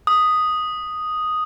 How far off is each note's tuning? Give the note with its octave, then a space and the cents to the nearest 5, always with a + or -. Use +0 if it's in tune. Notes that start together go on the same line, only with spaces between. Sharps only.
D#6 +0